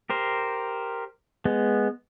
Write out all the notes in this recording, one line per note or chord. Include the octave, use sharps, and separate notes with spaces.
G4 A#4 C5
G#3 B3